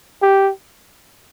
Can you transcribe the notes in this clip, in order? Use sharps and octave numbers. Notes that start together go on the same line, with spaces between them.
G4